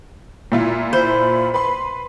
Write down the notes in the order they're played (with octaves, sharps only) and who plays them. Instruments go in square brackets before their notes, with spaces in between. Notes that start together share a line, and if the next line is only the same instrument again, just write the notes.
[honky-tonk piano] A#2 E4 F4
[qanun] C5 [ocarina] B5
[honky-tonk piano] B4 C6 [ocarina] B5